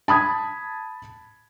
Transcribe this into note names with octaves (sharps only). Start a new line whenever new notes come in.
A5 B5 D#6 G#6